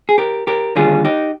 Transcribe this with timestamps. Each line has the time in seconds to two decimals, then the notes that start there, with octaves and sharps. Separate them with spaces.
0.09 G#4
0.18 G4 A#4
0.47 G4 A#4
0.76 D#2 D3 G3 F4 G#4
1.04 D#4 G4